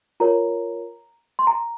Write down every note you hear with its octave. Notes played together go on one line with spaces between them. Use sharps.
F4 A#4 C#5 A#5
C6
A#5